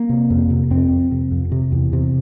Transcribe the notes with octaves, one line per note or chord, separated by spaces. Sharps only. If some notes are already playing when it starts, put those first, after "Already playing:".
Already playing: A#3
C3
F2
C3
F2 C4
F2
C3
F2
C3
E2
C3